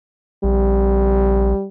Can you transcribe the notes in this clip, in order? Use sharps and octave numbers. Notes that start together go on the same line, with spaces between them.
A#1 G3